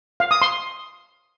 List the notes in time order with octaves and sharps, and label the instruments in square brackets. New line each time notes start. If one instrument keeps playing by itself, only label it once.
[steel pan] F5
D#6
C6